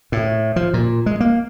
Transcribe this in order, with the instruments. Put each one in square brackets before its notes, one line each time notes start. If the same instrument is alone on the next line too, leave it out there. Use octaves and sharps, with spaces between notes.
[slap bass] A2
F3
A#2
G#3
A#3